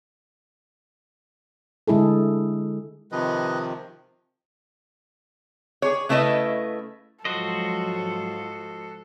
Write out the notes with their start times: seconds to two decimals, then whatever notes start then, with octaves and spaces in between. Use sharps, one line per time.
1.88 D3 G#3 E4 G#4 A4
3.12 C3 D#3 F3 B4 D#5
5.82 G#4 C#5
6.09 C#3 A3 E4 B4 D#5 E5
7.25 G#2 F3 F#3 F4 F#4 A4 C5 D#5